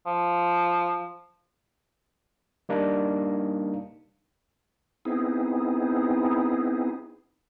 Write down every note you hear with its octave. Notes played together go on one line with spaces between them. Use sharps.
F3
G3 A#3 D4 D#4
B3 C4 D#4 E4 G#4